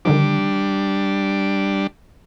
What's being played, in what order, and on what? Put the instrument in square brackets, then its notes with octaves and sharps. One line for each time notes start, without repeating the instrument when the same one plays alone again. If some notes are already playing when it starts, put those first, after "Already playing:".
[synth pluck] D3 D#3 F3 [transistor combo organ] G3 D4